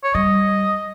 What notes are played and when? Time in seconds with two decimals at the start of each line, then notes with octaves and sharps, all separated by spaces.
0.04 C#5
0.14 G3 D#5